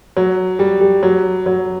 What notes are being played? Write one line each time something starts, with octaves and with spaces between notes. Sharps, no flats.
F#3
G3
G3
F#3
F#3